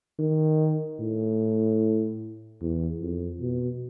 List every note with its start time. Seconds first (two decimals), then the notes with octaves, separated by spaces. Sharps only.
0.19 D#3
1.00 A2
2.61 E2
3.01 F2
3.41 B2